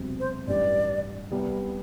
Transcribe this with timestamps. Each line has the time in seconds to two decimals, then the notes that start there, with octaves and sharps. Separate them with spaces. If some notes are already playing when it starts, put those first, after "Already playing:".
Already playing: E1 E2 C3 F#3 C4
0.20 C5
0.47 A1 G2 E3 G3 D5
1.31 C2 C3 G3 B3